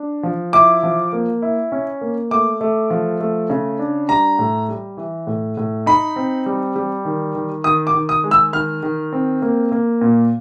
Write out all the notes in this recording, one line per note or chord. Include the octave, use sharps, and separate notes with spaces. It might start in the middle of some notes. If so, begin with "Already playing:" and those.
Already playing: D4
F3
E4 D6
F3
A#3
E4
C#4
A#3
A3 D6
A3
F3
A3
C#3
D4
G3 A#5
A2
G3
E3
A2
A2
D#4 B5
C4
G3
G3
D#3
D#3
D#3 D#6
D6
D#3
D#6
G#3
E6
D#3 F6
D#3
C4
A#3
A#3
A#2